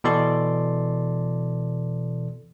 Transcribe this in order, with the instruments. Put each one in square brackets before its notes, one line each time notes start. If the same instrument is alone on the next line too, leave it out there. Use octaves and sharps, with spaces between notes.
[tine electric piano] B2 E3 A4 D5 C6